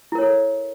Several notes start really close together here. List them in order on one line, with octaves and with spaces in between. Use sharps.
E4 A#4 C#5 A4